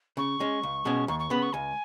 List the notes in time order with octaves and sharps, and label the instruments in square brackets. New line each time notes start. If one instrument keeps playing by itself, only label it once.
[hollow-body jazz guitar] C#3 [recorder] C#6
[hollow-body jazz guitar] G#3 C#4
C#2
B2 G#3 C#4
[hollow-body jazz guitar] D#2 [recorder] C#6
[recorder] C#6
[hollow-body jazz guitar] C#3 B3 [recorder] B5
[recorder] C#6
[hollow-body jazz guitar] C#2 [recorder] G#5